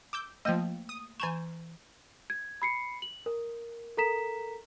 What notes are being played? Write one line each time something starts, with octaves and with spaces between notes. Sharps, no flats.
D6 E6 G6
F3 A3 A#3 D#5 G5
D#6
E3 G#5 A#5 C#6 G6 E7
G#6
B5 C7 C#7
F#7
A#4
A4 A#4 A#5 B6 E7